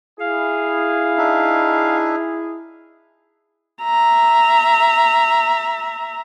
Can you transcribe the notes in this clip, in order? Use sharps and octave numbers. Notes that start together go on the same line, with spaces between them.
E4 G#4 F5
D4 D#4 E5
E5 A#5